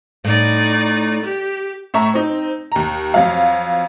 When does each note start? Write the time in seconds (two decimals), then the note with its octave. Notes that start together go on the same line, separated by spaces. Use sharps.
0.25 A2 D#4 D5
1.22 G4
1.94 A2 A3 E5 A#5 C#6
2.14 C4 D#4
2.72 D#2 A#5
3.14 F2 F#3 F5